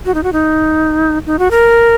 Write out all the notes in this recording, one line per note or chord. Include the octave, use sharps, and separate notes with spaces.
F#4
D#4
F#4
D#4
D#4
F#4
A#4